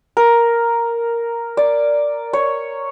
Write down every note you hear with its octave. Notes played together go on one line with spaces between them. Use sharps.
A#4
D5
C#5